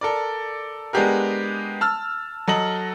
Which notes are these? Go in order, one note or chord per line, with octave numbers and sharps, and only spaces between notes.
A4 A#4 D5
G#3 B3 D4 G4 G#4 A#4
A5 E6 F6
F#3 A4 D#5 F#7